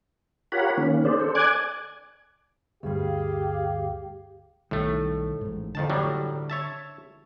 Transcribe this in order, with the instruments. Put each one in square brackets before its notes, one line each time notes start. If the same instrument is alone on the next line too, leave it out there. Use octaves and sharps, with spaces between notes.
[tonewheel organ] F4 G4 A#4 C#5 F#5 B5
D#3 A#3 C#4
C#4 D4 G#4 C5 D5
A4 C5
D5 G#5 D6 F#6 G#6
[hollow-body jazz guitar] D2 G2 G3 [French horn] G4 [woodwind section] G#4 F5
[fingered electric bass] B1 D#3 G3 [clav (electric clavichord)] A2 A3
[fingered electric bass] A1 G#2
[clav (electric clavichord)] F2 D#3 A5 [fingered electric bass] D3
[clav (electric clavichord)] A2 F#3 G3
C#5 E5 A5